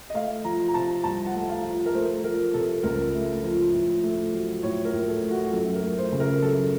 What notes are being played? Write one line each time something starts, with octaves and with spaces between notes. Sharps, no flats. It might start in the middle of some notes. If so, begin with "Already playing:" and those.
D#5
A3 F5
F3 A#5
A#5
C3 A5
C2 A5
F#5
A3
F5
F3
A#4
A3 C5
F3 A#4
C3 A4
C#2 A#4
A3
F3
A2
A3
F#3
A2 C#5
A#4
A2
A4
A3
F#4
F#2 A4
A#4
A3
C5
C#3
A#4
F#2 A4